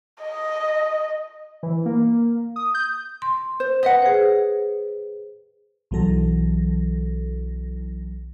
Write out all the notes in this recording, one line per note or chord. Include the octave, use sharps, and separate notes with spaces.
D#5
E3
A#3
D#6
G6
C6
C5
B4 D#5 F#5 A#6
G#4 C5
B1 E3 F#3 A4 A#6